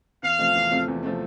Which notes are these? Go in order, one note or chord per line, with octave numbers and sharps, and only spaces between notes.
E2 F5
C3 F3 A3 C4
E2
C3 F3 A3 C4
E2
C3 F3 A3 C4